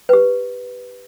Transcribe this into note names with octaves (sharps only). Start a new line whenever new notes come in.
G4 B4